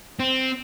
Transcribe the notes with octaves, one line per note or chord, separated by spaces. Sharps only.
C4